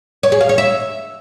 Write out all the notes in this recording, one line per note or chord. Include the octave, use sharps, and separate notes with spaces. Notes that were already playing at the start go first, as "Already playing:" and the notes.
C#5
G#4
F5
C#5
E5